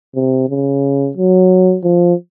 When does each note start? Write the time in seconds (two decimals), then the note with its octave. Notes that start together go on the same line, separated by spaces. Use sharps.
0.15 C3
0.49 C#3
1.17 F#3
1.83 F3